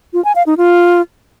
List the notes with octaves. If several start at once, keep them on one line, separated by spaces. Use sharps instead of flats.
F4
G#5
F5
D#4
F4